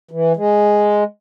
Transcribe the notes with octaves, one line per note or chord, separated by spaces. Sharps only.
E3
G#3